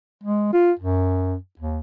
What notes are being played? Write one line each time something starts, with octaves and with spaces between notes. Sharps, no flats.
G#3
F4
F#2
D#2